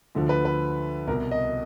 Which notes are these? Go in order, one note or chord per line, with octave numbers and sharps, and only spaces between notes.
D2 D3 F3
B4
B4
C2 B2 A#4
D#5